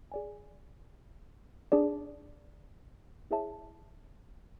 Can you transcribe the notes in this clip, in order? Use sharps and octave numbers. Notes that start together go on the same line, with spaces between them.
G#4 D5 G#5
D4 G#4 D5
E4 G#4 C#5 E5 A5